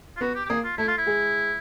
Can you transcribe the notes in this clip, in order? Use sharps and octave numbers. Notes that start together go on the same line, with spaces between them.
F4
B3 F#4 B4
G4
G4
A#3 G#4 A#4
F4
A3 E4 A4
F4
E4
G#3 G#4